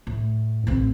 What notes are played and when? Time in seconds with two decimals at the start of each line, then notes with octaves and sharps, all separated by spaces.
0.07 A2
0.67 A1 C4